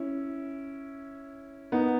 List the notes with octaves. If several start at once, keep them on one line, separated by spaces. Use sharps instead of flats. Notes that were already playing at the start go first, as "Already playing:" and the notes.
Already playing: C#4 E4
B3 D#4